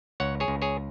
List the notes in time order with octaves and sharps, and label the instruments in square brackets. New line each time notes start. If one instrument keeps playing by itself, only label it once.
[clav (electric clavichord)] C#2 C#5 F#5
G#4 C#5
C#2
G#4 C#5